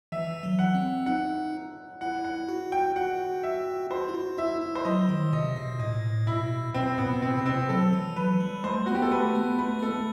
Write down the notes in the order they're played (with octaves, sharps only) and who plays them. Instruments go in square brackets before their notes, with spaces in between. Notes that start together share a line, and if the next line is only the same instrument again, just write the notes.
[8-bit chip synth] E3 [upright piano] E5
[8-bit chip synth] F#3
[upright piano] F#5
[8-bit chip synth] C4
[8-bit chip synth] D#4 [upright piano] F#5
[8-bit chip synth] E4 [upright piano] F#5
[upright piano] F#5
[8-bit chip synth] F#4
[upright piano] G5
[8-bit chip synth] F#4 [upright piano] F#5
[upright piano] E5
[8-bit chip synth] F#4 [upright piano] C5
[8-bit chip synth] E4
F#4
[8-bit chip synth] E4 [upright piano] E5
[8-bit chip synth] E4
[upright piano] C5
[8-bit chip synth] F#3 [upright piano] D#5
[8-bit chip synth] D#3
[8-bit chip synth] C3 [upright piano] D#5
[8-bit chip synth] B2
[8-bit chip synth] A2 [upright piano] D#5
[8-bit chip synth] B2 [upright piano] E4
[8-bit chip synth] B2 [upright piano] C4
[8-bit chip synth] A2 [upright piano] B3
[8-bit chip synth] B2
[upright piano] C4
[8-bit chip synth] C3
[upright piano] C4
[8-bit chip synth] F#3 [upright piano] A4
[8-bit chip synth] E3
[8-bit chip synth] F#3 [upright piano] B4
[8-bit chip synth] G3
[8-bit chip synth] A3 [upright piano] C5
[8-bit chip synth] B3 [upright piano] F#4
[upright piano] G4
A4
[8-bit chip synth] A3 [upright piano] B4
[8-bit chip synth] B3
[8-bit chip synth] A3 [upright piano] B4
[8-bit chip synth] B3 [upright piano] A4
[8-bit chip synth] A3